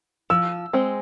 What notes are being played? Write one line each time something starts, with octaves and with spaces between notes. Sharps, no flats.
F3 E6
G#3 C4